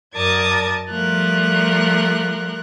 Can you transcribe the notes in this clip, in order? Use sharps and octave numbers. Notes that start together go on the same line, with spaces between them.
F#2 A#4 D5 A5 D#6 G#6
F3 G3 A3 A#4 F#6